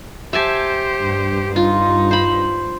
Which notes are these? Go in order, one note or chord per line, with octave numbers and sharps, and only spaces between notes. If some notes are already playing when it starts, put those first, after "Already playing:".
G4 C5 E5 G#5 A5
G2
D#4 F4
C5 B5